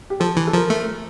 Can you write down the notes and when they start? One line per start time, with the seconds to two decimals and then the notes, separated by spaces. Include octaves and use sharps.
0.10 G4
0.20 F3 A4
0.37 E3
0.47 A4
0.54 F3 A#4
0.70 A3